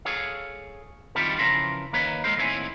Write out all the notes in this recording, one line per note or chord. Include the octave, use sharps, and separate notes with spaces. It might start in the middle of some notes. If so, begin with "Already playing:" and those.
G#4 A4 C#5 F5
D#3 G3 C4 E4 F4 A4
C#3 E3 F3 A#4 E5 C6
D#3 A#3 B4 C#5
G#3 A#3 A4 A#4 C5
D#2 A2 C4 E4 C#5 G#5